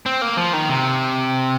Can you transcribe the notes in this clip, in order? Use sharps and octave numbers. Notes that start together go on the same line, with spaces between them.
C4
A#3
F3
D#3
C3